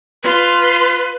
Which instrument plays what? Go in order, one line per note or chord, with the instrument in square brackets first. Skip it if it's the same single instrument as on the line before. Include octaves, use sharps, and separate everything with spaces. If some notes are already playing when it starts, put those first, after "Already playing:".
[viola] F4 C6 [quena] B4